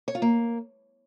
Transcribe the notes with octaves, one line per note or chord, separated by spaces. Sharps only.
C#5
F4
A#3